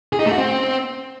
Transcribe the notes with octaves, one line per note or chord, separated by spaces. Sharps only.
G#4
D#4
A3
F#4
C4